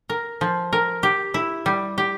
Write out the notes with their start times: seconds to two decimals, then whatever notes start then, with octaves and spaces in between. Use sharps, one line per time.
0.10 A#4
0.41 F3
0.73 A#4
1.03 G4
1.34 E4
1.66 G3
1.98 G4